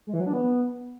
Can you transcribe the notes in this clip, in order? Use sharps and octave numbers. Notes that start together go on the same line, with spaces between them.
G#3
E3
F#3
D4
B3